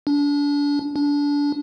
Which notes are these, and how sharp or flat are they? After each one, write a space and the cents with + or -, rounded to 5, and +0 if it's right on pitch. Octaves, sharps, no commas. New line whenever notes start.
D4 -30
D4 -25